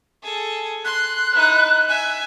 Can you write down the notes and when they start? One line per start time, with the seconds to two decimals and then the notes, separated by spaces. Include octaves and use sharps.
0.23 G#4 A4
0.85 C6 F#6
1.33 D#4 E4
1.88 E5 G#5